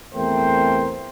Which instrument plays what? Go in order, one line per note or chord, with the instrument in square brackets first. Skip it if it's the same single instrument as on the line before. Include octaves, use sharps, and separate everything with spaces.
[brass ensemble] E2 A3 C4 A#4 C5 G5